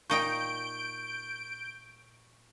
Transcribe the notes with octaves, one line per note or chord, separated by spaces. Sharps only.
A#2 D#4 G5 C#6 G6 D7